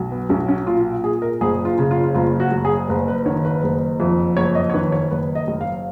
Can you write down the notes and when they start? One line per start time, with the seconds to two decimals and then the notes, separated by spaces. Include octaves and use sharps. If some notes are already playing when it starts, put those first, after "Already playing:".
Already playing: B1
0.11 B3
0.29 B1 C#4
0.49 C#4
0.67 A#2 F4
1.03 A#2 G#4
1.22 A#4
1.41 F#1 G#4
1.65 F4
1.79 C#3
1.91 F4
2.15 F#1 F4
2.40 F#4
2.52 F#2
2.65 G#4
2.89 F#1 B4
3.08 B4
3.26 D#3 C#5
3.45 B4
3.63 F#1
4.00 F2
4.37 F#1 C#5
4.55 D#5
4.70 C#5
4.74 D#3 B4
4.92 C#5
5.11 F#1 B4
5.35 D#5
5.48 F#2
5.61 F5